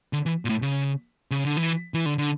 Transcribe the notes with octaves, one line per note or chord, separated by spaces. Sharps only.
D3
E3
A#2
A2
C#3
C#3
D3
E3
E3
D3
D3